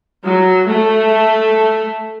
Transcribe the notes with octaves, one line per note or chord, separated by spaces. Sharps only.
F#3
A3